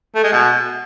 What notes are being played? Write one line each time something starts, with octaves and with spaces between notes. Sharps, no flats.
A3
G#3
B2